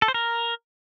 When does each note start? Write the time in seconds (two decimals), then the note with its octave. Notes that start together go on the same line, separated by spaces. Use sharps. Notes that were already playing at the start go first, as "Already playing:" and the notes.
0.02 A4
0.08 C5
0.14 A#4